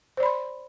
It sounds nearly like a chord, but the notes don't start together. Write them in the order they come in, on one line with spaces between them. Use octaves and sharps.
C5 D5 B5 C6